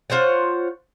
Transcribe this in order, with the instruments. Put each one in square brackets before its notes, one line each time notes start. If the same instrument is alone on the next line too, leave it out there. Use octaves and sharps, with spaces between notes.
[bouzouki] F4 C5 C#5 F#5